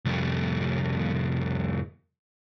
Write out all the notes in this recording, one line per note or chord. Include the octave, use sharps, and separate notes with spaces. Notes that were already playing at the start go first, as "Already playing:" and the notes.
C2 F2